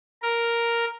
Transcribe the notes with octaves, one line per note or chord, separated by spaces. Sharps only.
A#4